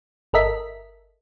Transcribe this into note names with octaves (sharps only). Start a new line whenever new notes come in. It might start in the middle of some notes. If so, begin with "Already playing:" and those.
G1 A4 A#4 D#5 E5 B6